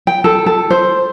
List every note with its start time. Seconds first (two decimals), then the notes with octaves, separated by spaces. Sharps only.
0.07 G5
0.24 A4
0.46 A4
0.71 C5